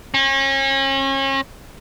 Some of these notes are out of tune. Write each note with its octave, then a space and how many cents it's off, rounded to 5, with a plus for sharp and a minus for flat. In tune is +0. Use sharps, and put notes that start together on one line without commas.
C#4 -35